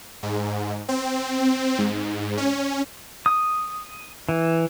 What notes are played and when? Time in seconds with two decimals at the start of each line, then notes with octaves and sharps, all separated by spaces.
0.23 G#2
0.89 C4
1.78 G#2
2.38 C#4
3.26 D#6
4.29 E3